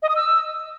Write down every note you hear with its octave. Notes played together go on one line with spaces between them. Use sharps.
D#5
D#6
E6